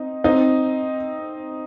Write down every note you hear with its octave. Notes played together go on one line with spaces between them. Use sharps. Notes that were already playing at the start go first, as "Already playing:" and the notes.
Already playing: C4 D#4
C4 D#4